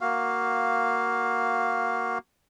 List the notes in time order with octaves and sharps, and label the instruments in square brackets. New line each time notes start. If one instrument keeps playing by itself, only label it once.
[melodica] A#3 F#4 F5